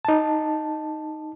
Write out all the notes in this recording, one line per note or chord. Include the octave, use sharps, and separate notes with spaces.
D#4 A5